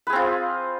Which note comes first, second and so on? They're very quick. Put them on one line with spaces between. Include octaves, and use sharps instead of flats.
B4 G#4 C4 F4